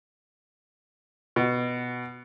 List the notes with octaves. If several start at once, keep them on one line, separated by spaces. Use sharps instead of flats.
B2